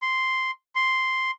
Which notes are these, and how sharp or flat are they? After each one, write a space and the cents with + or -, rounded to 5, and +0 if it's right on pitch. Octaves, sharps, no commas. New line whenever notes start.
C6 -5
C6 +0